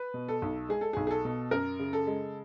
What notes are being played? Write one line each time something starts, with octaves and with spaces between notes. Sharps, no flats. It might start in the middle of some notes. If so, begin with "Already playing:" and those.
Already playing: B4
B2
A4
B1
G#3 G#4
A4
B1 G#4
G#4
A4
B2
F#2 A#4
C#3
A4
G#3